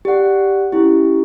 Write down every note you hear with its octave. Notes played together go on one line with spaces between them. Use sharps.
G4 D5 F#5
C#4 E4 G4